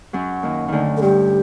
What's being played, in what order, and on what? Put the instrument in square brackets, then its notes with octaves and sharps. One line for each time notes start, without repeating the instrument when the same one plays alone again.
[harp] F#2 F#3
D#2 D#3
D2 D3 D#3
[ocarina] A4
[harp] G2 G3 [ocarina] G4